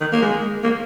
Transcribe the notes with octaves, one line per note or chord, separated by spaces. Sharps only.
D#3
A#3
G#3
A#3